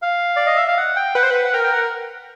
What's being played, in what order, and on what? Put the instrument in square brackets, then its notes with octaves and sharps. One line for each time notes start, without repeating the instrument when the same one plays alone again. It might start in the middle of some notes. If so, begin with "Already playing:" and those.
[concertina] F5
D5
D#5
E5
F5
F#5
G5
[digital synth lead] B4 [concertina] F#5
[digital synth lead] C5
[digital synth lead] B4 [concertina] F#5
[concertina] F#5
[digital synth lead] A#4 [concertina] G5
[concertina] G5
F#5